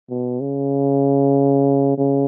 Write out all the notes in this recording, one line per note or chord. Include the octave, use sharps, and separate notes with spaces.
B2
C#3
C#3